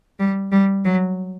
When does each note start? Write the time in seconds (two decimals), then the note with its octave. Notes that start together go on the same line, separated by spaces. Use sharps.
0.19 G3
0.52 G3
0.85 F#3